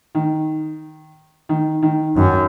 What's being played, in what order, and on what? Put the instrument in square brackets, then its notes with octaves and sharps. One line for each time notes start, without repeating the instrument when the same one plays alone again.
[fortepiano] D#3
D#3
D#3
[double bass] F#2 [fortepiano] D#3